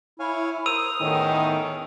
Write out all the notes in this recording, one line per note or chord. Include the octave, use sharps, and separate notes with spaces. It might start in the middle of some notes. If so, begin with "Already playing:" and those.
E4 C#5 F5 G#5
A#4 C5 D#6 E6 D#7 F7
E2 A2 D#3 C#4